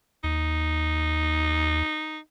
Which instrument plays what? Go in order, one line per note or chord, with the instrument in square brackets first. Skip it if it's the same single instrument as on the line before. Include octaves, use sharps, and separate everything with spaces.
[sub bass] D#2 [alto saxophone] D#4